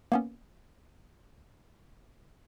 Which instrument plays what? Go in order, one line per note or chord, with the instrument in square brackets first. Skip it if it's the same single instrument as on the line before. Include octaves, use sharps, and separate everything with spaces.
[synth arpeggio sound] A#3 B3 C#4